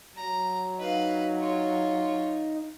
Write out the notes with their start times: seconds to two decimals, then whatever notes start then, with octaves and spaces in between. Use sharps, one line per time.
0.16 F#3 A#5
0.79 D#4 B4 F5
1.39 F4 C#5